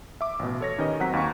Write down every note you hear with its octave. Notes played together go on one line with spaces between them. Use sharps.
E5 D6
A1 B2
A4 C#5 A#6
D#3 C#4 G4 A#4 B4 D#5
F#3 C4 F#5 A#5 B6
D#2 F5 C#6